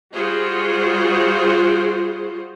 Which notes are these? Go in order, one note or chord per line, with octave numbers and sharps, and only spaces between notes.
G3 F4 F#4 G#4 C5